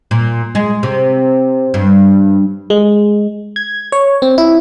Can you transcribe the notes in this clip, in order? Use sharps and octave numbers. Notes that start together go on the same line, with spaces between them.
A#2
G#3
C3
G2
G#3
G#6
C#5
C4
E4